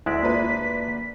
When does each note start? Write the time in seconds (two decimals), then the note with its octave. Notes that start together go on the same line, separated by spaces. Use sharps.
0.06 D2 G#3 E4 D5 B6
0.23 A#3 D4 F4 B4